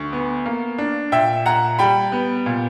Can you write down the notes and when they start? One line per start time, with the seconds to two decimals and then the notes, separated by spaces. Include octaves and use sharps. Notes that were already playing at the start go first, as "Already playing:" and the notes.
Already playing: D2 C#6
0.13 B3
0.46 A#3
0.78 D4
1.12 A#2 E5 G5
1.46 A#2 F#5 A#5
1.79 G3 G5 B5
2.12 B3
2.46 A#2